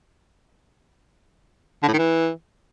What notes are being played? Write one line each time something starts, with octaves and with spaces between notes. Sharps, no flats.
D3
A2
D#3
E3